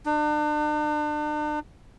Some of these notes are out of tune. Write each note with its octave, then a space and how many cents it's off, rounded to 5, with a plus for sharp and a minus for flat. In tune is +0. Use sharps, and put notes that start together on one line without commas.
D4 +40